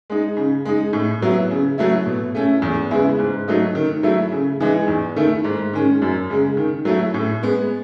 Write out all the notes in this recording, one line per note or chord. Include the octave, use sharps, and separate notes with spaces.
G#3 D#4
C#3
G#3 D#4
A2
F#3 B3 E4
C#3
F#3 A3 E4
B2
A3 C#4 E4
E2
C#3 G#3 B3 E4
G#2
F#3 A3 D#4
D#3
F#3 A3 E4
C#3
E3 G#3 D#4
E2
D#3 A3 E4
G#2
D#3 G#3 C#4
F#2
C#3 G#3
D#3
F#3 A3 E4
A2
G#3 B3